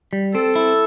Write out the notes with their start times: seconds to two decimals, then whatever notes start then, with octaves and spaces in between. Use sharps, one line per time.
0.13 G3
0.34 C4 A4
0.56 E4